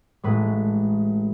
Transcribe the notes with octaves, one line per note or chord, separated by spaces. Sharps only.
A1 A2 G#3 B4